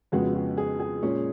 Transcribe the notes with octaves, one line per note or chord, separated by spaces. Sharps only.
F2 C#3 G#3 B3 F#4
F#4
G#4
G#4
A#2 G#3 C#4